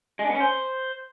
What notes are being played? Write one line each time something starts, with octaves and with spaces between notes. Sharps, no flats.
G#3
D4
B3
C#4
C5